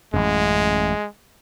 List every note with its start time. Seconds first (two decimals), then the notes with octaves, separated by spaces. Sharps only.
0.14 A1 F#2 G#3